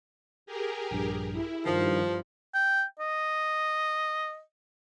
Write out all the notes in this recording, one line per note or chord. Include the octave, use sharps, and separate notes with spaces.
G4 G#4 A#4
A#1 G2
E4
G2 D#3 F3
G5
D#5